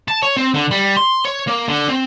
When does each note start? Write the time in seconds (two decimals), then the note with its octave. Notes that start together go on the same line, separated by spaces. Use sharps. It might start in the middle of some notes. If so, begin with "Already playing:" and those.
0.08 A5
0.23 C#5
0.37 C4
0.54 D3
0.71 G3
0.96 C6
1.25 C#5
1.47 A#3
1.68 D3
1.88 C4